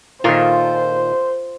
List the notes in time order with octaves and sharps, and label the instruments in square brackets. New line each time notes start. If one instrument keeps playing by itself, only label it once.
[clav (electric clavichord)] A#2 D#3 [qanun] F4 A4 A#4 [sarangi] C5